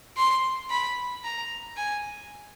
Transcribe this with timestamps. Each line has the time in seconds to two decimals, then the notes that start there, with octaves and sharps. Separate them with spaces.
0.17 C6
0.70 B5
1.24 A#5
1.77 G#5